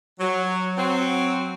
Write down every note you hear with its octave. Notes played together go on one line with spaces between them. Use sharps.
F#3
F#3 C4